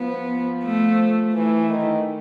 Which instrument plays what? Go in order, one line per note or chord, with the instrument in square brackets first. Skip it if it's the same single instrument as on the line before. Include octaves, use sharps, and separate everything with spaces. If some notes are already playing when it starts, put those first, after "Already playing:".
Already playing: [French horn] F3 [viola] B3
[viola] A3
[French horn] E3 [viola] A3
[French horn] D#3